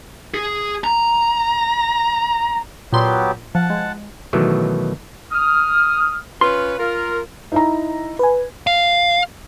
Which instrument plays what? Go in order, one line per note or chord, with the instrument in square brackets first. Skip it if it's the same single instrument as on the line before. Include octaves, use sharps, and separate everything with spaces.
[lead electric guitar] G#4
A#5
[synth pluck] A#2 C6 [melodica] F#3 B3 G4
[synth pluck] F3 [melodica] F#5 A5
[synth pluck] G#3
[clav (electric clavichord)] B2 D#3 E3 F#3 A3
[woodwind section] D#6 F6
[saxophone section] C#4 F4 B4 [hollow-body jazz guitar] C6
[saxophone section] F4 A#4
[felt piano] D#4 E4 A#5
[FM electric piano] B4 G#5
[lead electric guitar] F5